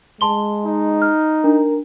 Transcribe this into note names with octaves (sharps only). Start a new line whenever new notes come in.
G#3 A5 C6 G7
D#4
F6
D4 A#4